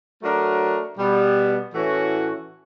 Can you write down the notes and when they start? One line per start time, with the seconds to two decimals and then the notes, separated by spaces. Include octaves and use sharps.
0.21 F#3 A3 D4 F#4 A#4
0.98 B2 G3 B3
1.73 A2 E3 A3 C#4 F#4